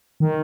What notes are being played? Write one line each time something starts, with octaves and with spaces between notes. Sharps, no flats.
D#3